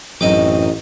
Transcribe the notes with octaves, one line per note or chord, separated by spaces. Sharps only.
A1 F#2 A3 C4 D#4 D#5 D6